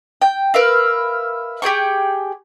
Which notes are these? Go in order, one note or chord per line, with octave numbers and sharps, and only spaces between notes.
G5
A#4 B4 E5 F5
G4 G#4 G5 C#6